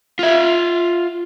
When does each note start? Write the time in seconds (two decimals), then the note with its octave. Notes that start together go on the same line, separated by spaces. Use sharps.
0.19 F4 E5